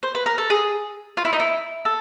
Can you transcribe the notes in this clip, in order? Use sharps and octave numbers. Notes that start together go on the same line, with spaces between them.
C5
B4
A#4
A4
G#4
F4
E4
D#4
E4
A4